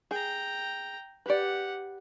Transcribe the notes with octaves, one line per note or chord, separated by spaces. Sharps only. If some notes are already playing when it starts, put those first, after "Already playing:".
G#4 G5 A#5
G4 B4 D5 F#5